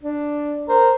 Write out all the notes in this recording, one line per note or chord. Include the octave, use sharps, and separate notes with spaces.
D4
A#4 C5